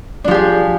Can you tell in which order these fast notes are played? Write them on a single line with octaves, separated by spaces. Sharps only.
D4 F3 G4 G#4